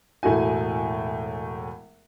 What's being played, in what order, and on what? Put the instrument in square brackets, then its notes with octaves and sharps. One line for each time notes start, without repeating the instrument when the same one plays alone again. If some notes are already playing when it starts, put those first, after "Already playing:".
[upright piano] E1 A2 A3 F#4 G#5